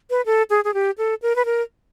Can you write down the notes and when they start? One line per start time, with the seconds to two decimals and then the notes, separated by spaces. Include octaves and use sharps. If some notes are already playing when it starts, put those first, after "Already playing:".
0.10 B4
0.26 A4
0.50 G#4
0.65 G#4
0.74 G4
0.98 A4
1.22 A#4
1.36 B4
1.45 A#4